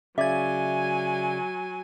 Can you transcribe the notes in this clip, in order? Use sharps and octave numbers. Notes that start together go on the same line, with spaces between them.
C#3 F#3 D5 E5 G#5 G#6